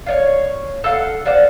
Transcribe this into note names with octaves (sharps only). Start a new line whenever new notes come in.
C#5 D5 F5
A4 F5 F#5
C5 D5 F5 F#5